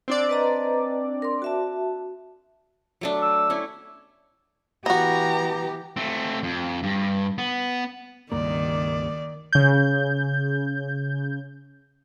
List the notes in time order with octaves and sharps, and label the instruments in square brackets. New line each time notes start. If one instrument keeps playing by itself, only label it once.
[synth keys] C4 D4 D5
[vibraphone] B4 D#5 A#5
A#4 C6
F#4 E5 A5
[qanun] F#3 A3 D4
[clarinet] E6
[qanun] A3 C#4 E4
[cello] E3 G4 [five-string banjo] B3 F#4 [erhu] A#5
[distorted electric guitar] A3 C4
F2
G2
B3
[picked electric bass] C#2 G2 A#3 [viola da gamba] D#3 [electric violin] D5
[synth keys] C#3 G6